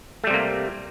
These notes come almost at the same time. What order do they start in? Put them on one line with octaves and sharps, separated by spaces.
A3 G3 C3 A#3